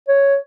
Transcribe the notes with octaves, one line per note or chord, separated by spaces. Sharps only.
C#5